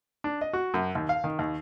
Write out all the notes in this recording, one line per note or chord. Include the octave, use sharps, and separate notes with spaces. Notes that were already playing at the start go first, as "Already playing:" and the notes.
D4
D#5
F#4
F#2
D#2
F5
D#3
D#2